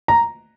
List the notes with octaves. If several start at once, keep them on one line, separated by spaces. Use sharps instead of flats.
A#5